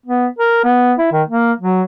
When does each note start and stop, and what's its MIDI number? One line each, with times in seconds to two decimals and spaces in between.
0.06 0.27 59
0.38 0.62 70
0.64 0.93 59
0.99 1.08 64
1.12 1.22 51
1.28 1.53 58
1.60 1.82 54